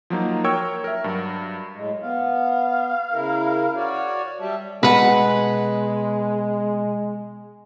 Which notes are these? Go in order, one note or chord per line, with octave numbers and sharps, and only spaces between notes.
F3 F#3 A#3 D#4
A#4 C#5 G5 C#6 E6 G#6
A#4 E5
G2 F#3
A2 G#3
B3 F5
C#3 E4 A#4
F#4 C#5 D5
G3 E5 A5
B2 G#3 B4 F#5 A5